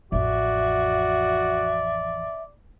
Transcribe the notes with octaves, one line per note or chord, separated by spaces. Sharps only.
A1 F2 F#4 D5 E5